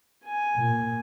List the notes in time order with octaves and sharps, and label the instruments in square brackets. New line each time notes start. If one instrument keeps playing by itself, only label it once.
[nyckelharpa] G#5
[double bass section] A#2